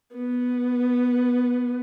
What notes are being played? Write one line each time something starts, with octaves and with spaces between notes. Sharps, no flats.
B3